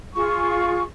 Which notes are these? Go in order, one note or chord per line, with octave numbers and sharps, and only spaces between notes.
F4 G#4 C#6